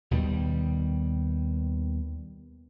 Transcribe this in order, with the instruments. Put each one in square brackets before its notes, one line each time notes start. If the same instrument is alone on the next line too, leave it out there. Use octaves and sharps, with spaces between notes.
[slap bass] D#2 B2 D#3 G3